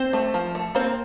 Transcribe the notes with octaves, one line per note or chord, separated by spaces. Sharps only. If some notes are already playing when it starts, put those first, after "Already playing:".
Already playing: C4 C5
A3
F3
A3
A#3 C4 C5